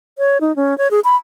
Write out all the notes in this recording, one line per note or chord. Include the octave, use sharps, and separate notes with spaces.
C#5
D#4
C#4
C#5
G#4
B5